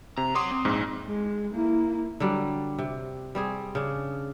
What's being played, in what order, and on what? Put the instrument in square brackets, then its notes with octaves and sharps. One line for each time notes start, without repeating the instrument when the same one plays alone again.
[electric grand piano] C3 [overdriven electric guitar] A#5
[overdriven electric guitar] C#5 F#5 [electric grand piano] C6 D6 D#6
[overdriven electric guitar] C4
[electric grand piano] A#1 G#2
[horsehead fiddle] G#3
A#3 E4
[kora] D3 F#3 G3
C3
G3 C4 G#4
C#3 D4